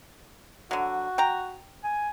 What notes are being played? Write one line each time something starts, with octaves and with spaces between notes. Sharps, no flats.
D3 F#3 F#4
G5 A#5
G#5